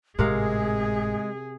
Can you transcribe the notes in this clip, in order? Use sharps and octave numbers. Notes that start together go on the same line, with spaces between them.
G#1 A2 C3 G#3 G#4 A#4 F5